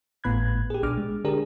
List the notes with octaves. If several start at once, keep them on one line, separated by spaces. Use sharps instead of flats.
G#1 A2 B3 B5 F#6 G#6
G4 G#4
A#1 B2 D4 D6 F6
G#3
D3 D4 G4 G#4 A#4